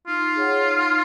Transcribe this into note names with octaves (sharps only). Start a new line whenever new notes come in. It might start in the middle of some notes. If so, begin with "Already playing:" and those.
D#4 F4
G#4 C#5 F#5
D#4